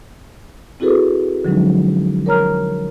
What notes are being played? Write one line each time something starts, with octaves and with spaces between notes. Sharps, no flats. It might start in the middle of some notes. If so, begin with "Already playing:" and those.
C4 E4 F#4 G#4 A4 B4
D3 F3 F#3 G#3 C#4 D#4
A#4 C#5 A#5 F6